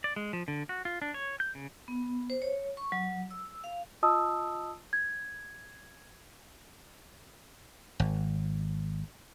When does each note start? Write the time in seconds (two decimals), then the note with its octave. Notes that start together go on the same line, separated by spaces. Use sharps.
0.04 D5
0.16 G#3
0.33 F3
0.48 D3
0.69 F#4
0.85 F4
1.02 D4
1.14 C#5
1.40 G6
1.55 C#3
1.88 B3
2.30 C5
2.42 C#5
2.77 C#6
2.92 F#3
3.31 E6
3.64 F5
4.03 F4 D#5 A5 D#6 E6
4.93 G#6
8.00 G#1